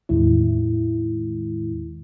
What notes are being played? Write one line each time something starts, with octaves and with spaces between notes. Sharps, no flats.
E2 A2 D#3 G#3 E4